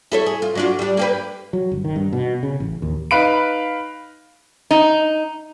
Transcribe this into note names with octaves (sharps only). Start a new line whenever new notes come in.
E4 A4 C#5
G#4
F4
F#3 D4 F4
G3 D4
A#3 G4 B4
F#3
G1
D#3
G2
B2
C#3
A1
D#2
D#4 B4 F5 B5 D7
D#4